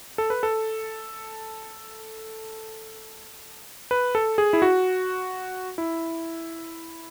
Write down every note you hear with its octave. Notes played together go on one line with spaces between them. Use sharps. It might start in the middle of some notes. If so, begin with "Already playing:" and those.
A4
B4
A4
B4
A4
G#4
E4
F#4
E4